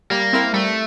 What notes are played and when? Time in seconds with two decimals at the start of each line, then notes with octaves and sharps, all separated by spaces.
0.10 G3 A#3
0.33 C4 E4 A#4
0.54 G3 A3